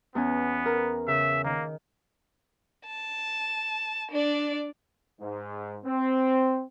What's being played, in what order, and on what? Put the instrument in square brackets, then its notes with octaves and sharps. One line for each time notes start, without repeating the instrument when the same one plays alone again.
[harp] E2 C#4 G#5 [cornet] B3
[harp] A#4
[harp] C#3 [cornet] E5
[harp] D#3 [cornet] A#3
[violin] A5
D4 D5
[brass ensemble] G#2
C4